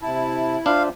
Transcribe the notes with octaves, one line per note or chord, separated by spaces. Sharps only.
C3 E4 A5
D4 F4 C5 E5 F5